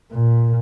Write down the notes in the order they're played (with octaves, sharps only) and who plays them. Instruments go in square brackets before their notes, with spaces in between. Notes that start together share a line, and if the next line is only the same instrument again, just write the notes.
[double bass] A#2